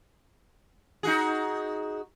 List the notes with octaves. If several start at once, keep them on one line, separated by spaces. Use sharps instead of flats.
D#4 F#4 G#4